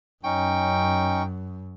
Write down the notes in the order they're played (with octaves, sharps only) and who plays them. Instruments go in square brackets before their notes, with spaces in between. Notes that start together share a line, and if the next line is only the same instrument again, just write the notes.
[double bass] F#2 [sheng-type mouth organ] C#4 D#4 C#6 [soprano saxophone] G5